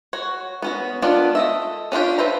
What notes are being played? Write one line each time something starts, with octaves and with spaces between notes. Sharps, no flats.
F#4 C#5
B3 C#4 F#4
D#3 B3 D4 F4 D5
A4 D#5 E5
C#4 D4 F4 G4
B4 C5 E5 A#5